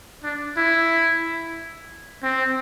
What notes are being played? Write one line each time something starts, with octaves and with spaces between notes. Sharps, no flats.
D4
E4
C4